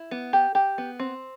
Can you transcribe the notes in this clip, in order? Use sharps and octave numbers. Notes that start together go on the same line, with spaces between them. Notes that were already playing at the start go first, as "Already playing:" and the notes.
Already playing: E4
B3
G4
G4
B3
C4